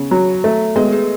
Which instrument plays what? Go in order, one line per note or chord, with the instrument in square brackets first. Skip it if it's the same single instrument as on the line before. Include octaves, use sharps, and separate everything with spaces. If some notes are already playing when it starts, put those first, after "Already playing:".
Already playing: [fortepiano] C#3 [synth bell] B3
[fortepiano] F#3
A3
[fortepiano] G#3 [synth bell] B3 B4
[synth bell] G#4